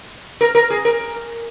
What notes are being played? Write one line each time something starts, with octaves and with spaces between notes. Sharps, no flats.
A#4
A#4
G#4
A#4